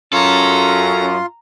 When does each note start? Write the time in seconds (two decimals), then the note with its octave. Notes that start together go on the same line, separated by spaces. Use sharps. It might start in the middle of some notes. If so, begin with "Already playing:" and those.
0.13 F#2 C#4 F4 A4 A#5 C6